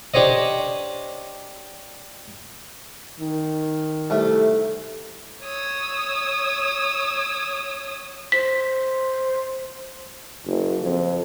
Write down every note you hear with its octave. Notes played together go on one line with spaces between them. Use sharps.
D4 G4 C5 C#5 D#5
D#3
C2 A3
C#5 D#6 E6
C5 B6
F#1
F2